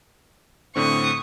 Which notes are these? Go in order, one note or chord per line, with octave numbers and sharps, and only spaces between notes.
A2 D3 C4 C#6 D#6